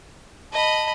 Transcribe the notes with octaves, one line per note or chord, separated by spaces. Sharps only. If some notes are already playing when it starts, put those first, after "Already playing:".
D#5 A5 B5